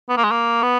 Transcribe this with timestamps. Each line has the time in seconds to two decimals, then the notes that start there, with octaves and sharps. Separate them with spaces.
0.09 B3
0.17 A#3
0.24 G#3
0.31 A#3
0.63 B3